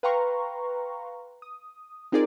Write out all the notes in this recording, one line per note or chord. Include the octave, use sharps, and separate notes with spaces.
B4 F5 G5 A#5 C6 C#6
D#6
C4 D#4 F4 G#4 A#4 D5